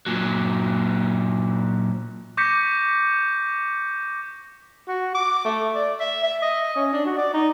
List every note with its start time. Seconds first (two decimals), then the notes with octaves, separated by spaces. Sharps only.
0.06 A#2 F#3
2.37 C#6 D6 G6 A#6 B6 C#7
4.88 F#4
5.15 D6
5.45 A3
5.75 D5
6.00 E5
6.23 E5
6.42 D#5
6.76 C#4
6.93 D4
7.06 F#4
7.17 D5
7.33 D#4